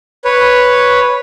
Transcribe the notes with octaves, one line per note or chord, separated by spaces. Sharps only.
B4 C#5